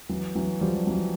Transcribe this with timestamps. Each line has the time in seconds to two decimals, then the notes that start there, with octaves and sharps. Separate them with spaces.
0.09 E3 F#3
0.35 E3 F#3
0.61 F3 G3
0.75 G3
0.87 E3 F#3